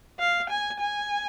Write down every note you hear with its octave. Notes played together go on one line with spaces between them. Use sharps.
F5
G#5
G#5